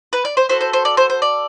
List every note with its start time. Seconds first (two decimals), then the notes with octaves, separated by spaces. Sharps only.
0.13 B4
0.25 D5
0.37 C5
0.49 B3 F#4 A4 C5
0.61 C5
0.73 C5
0.85 D5
0.97 C5
1.10 C5
1.22 D5